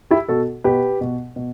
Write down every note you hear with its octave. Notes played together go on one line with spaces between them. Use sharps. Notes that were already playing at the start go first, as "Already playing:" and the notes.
E4 G4
B2 F#4 A4
B2 G4 B4
B2
B2